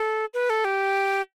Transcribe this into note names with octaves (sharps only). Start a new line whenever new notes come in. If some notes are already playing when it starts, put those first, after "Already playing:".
Already playing: A4
B4
A4
G4